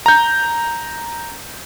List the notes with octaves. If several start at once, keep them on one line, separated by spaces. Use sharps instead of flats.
A#5 G6